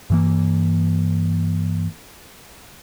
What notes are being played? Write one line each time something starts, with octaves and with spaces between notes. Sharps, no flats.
G2 E3 A#3